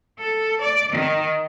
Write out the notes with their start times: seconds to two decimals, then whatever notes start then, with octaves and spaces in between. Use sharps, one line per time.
0.19 A4
0.61 D5
0.92 D#3